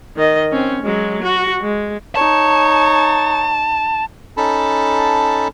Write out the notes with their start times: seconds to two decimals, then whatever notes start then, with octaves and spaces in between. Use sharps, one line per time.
0.16 D#3 D#5
0.52 C4 C#4
0.83 F#3 G#3
1.22 F#4
1.61 G#3
2.16 D#4 C#5 A5
4.37 C#4 D#4 A4 A5 B5